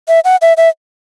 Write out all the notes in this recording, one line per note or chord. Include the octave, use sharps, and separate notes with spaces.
E5
F#5
E5
E5